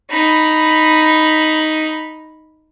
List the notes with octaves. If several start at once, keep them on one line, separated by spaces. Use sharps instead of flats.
D#4 B5